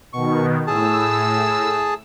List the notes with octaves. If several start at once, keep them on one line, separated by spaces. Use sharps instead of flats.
B2 D#3 C#6
A2 G#4 A5 E6